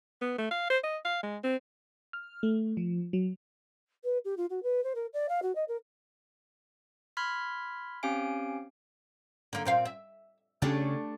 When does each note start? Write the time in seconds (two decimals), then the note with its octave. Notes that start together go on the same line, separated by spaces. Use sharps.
0.22 B3
0.38 A3
0.51 F5
0.70 C5
0.84 D#5
1.05 F5
1.23 G#3
1.44 C4
2.13 F6
2.43 A3
2.77 F3
3.13 F#3
4.04 B4
4.25 G4
4.37 F4
4.50 F#4
4.63 B4
4.84 C5
4.95 A#4
5.14 D5
5.29 F5
5.43 F#4
5.55 D#5
5.68 A#4
7.17 B5 C6 F6 G#6 B6
8.03 C4 C#4 G4 F5 G#5 D7
9.53 D3 A#3
9.65 A#2 C4 F5
9.85 E5
10.62 C#3 A3 C#4 D4 G4